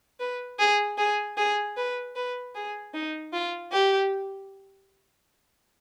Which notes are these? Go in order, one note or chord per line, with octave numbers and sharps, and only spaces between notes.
B4
G#4
G#4
G#4
B4
B4
G#4
D#4
F4
G4